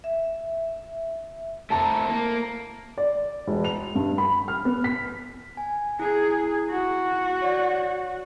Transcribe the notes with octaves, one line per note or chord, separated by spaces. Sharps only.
E5
A3 C4 E4 A5 A#5
A#3
D5
E1
F7
G2
B5
F6
B3
B6
G#5
E4 G#4
F#4
C#5 D5